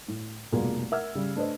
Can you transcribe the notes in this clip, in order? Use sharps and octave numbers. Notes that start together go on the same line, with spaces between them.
A2
F1 B2 G3 A#3 F4 G#4
A#4 E5 F#5 E6 F6 G#6
C#3 G3
A3 D4 B4 C5 D#5